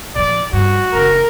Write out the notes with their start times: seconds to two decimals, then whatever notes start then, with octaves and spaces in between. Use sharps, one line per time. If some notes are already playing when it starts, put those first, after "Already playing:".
0.15 A#2 F3 D5
0.53 G2 F#4
0.93 F#1 A#4